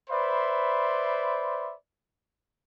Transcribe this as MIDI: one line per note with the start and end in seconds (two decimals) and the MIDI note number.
0.10 1.74 71
0.10 1.74 72
0.10 1.74 74
0.10 1.74 76
0.10 1.74 83
0.10 1.74 84